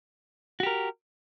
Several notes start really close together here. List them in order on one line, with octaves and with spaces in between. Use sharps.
F#4 G4 A#4